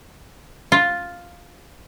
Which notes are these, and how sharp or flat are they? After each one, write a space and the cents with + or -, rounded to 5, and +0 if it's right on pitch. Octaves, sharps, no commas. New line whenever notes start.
F4 +5